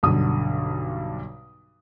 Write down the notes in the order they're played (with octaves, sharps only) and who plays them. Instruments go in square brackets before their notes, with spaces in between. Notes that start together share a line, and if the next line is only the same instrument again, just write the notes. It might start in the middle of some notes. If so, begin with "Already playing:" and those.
[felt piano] B1 G2 D3 D#6